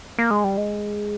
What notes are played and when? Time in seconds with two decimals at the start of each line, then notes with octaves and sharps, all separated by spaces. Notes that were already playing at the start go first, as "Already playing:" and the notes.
0.19 A#3
0.31 G#3
0.44 G3
0.57 G#3